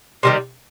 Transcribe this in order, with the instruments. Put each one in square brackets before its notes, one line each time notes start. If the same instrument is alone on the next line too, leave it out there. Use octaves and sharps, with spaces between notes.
[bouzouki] C3 D#3 G3